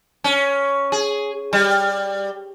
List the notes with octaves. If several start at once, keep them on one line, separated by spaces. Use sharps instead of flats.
C#4
G#4
G3